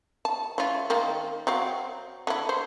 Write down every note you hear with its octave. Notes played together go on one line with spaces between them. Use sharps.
A5
E3 C#4 F4
D#3 A#3 C4
F#3 C4 F5
D3 E4
C5